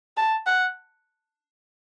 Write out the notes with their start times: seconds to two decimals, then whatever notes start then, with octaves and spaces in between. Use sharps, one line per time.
0.17 A5
0.47 F#5